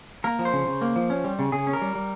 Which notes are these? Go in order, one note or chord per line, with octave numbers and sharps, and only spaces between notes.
A#3 A#4
F3
C5
C#3
C#3
A#3
F3
C#4
G3
C#3
C#3 G#4
C#4
A#4
G3
G3